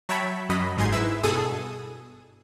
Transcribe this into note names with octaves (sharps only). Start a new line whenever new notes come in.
F#3 C#5 E5 G5 A5 B5
F#2 F#3 D#5 B5
G1 G#2 D#4 G#4 C6 G#6
G#2 E4 B4 E6 E7
G2 B2 G#4 A4 D#6